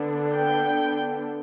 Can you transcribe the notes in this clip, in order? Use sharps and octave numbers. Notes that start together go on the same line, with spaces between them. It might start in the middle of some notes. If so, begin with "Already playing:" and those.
Already playing: D3 B3 D4
G5